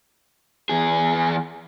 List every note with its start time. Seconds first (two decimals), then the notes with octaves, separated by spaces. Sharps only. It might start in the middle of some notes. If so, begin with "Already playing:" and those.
0.69 E2 G#4